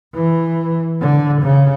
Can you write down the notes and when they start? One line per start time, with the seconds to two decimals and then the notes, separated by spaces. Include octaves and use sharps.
0.15 E3
1.00 D3
1.42 C#3